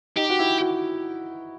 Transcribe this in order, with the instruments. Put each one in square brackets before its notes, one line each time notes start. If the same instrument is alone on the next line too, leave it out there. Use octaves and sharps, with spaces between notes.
[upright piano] D#4 [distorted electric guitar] G4
[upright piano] F#4
E4
F#4